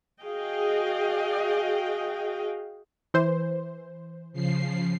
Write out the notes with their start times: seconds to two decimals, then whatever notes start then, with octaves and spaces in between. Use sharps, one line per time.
0.21 F#4 G#4 D#5 F5 G5
3.14 E3 C5
4.33 C#3 F3 C7